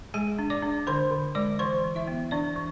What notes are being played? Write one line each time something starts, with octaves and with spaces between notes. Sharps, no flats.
G#3 G#4 G#5
D4
D5 D6
D4
D3 C5 C6
D3
G#3 D5 D6
E3 C5 C6
E3
E4 E5
B3
E3 D4 D5
E3